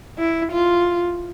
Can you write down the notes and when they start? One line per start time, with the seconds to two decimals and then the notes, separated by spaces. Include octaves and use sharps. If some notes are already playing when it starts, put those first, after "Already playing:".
0.19 E4
0.52 F4